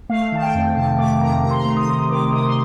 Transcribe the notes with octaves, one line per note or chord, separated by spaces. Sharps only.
A3 F5
D#3 A5
G5
F2
C3 A5
A3 D6
D#3 A#5
C3 A#5
C6
A#5
A3
D#6
C3
D#3 D6
C3 D#6
C6